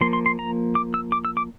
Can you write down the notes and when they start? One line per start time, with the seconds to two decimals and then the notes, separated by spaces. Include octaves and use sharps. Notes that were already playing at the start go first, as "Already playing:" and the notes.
0.01 F3 A#3 C6
0.13 C6
0.26 C6
0.39 A#5
0.75 D6
0.94 E6
1.12 D6
1.25 E6
1.37 D6